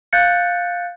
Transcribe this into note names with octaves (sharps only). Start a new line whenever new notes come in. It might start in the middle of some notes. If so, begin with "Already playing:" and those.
F5 F#6 G6 A6 C#7